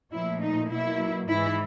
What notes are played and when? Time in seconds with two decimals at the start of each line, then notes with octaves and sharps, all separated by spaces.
0.12 A#2 F3 A3 E4
0.42 D#4
0.70 B2 F#3 A#3 E4
1.28 G#2 E3 G#3 E4